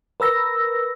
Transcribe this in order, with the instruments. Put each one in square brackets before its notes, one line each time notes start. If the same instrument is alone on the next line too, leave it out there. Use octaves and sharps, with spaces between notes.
[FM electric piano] A#4 B4 E6 A#6